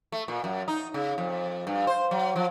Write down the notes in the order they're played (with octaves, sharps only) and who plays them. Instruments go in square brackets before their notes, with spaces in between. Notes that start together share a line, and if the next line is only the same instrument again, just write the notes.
[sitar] A3
A#2
F#2
D#4
C#3
F2
G2
C5
F#3
F3